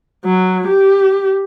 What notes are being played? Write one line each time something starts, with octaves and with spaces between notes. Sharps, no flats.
F#3
G4